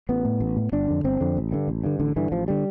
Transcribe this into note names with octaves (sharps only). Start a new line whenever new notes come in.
A1 B3
A2
A1
A2
G1 D4
F2 D3
G1 C4
F2 D3
A1
G2 D3
A1
G2 D3
A1 D3
G2 D3 E3
A1 F3
D3 G3